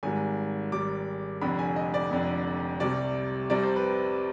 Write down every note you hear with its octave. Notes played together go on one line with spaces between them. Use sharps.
G#1 G#2 G3 G#5
G#1 G#2 G3 D6
F1 F2 D3 B5
G#5
D#5
D5
F1 F2 D3
C2 C3 G3 D5
C2 C3 G3 D5
C5
B4